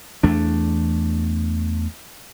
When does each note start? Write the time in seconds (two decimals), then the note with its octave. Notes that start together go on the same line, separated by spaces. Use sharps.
0.23 E2 A3 D4